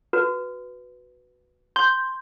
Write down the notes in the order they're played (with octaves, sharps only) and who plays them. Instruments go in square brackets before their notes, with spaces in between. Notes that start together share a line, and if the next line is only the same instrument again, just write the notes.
[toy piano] F#4 B4
[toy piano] C6 [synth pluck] G6